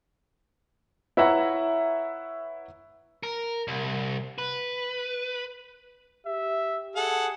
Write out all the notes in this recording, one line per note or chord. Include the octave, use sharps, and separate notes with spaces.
E4 B4 C#5 E5 F#5 A#5
A#4
C2
B4
G4 E5
G#4 A4 F#5